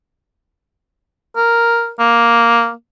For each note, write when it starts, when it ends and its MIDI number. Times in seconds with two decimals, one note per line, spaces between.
1.36 1.91 70
2.00 2.72 58